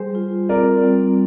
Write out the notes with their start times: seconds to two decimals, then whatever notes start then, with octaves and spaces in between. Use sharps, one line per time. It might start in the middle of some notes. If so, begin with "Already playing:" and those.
Already playing: G3 G#4 C5
0.15 F4
0.49 C4 A#4 D5
0.84 G3